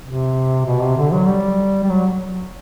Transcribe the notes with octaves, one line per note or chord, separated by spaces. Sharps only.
C3
B2
C3
D3
F#3
G3
G3
F#3